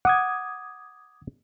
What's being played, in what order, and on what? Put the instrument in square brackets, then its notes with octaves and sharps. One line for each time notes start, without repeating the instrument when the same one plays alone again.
[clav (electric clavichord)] F#5 [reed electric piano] D6 D#6 G#6